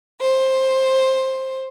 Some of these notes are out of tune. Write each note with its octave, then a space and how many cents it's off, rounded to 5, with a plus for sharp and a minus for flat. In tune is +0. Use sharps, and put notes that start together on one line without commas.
C5 +10